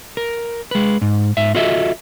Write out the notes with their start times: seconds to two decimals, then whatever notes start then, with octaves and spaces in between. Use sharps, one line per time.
0.17 A#4
0.71 G#3 B4
1.01 G#2
1.37 G#2 E5
1.55 F4 F#4 A4 D#5 E5